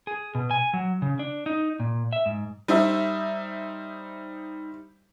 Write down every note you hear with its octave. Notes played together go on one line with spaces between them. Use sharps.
G#4
B2
G#5
F#3
C#3
D4
D#4
A#2
E5
G#2
G3 D#4 C5 E5